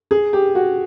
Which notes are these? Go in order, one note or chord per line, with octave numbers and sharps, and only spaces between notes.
G#4
G4
F#4